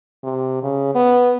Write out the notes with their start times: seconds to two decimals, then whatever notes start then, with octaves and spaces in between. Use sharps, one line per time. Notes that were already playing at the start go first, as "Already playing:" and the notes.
0.24 C3
0.63 C#3
0.95 B3